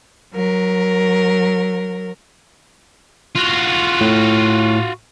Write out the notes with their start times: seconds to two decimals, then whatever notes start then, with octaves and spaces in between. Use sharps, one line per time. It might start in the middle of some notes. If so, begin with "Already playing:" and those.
0.34 F#3 A#4
3.36 F4 F#4
4.01 A2